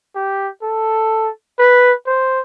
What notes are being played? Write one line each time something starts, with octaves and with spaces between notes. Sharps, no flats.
G4
A4
B4
C5